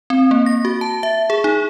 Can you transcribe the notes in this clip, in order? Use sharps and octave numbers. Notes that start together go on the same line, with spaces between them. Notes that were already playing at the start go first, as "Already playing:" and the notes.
C4
A#3
A#6
F#4
A5
E5
G#4
D#4